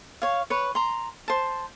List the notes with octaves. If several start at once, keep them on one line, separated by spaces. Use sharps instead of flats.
C#5 F5
B4 C#5
A#5 C6
C5 A5